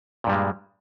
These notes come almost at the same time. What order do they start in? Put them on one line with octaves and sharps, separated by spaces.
A#2 G2 G3 G#3